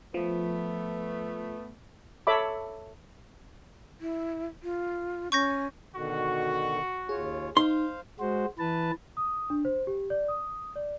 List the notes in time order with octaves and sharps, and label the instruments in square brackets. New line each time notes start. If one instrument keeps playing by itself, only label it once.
[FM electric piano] F3 [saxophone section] A3 B3
[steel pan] A4 C#5 E5 B5 D6
[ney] E4
F4
[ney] C#4 [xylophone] C#6 G6 A#6
[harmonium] B2 D3 D#3 [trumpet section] F#4 C#6
[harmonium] D#2 F4 C#5 [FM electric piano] G#4
[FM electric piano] D#4 [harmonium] C5 F5 [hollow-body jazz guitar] C6
[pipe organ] G#3 F#4 C5
E3 B4 A5
[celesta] D#6
D4
C5
G4
D5
D#6
D5